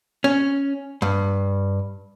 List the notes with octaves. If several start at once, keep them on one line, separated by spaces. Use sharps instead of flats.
C#4
G2